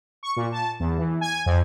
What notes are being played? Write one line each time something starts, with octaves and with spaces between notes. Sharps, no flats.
C#6
A#2
A5
E2
E3
G#5
F2